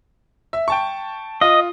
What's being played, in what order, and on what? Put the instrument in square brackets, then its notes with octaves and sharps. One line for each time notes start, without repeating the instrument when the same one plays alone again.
[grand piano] E5
G5 A5 C#6
[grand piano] F4 [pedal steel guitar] D#5